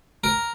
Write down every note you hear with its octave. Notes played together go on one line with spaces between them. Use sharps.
A#4